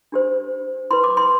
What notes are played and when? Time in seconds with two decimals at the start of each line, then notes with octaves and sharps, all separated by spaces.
0.12 D4 G4 C5
0.91 F4 B4 C6
1.04 D6
1.17 C6